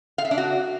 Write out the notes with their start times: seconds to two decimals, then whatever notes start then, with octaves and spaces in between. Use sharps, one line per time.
0.18 F5
0.25 E5
0.31 D4
0.38 F#4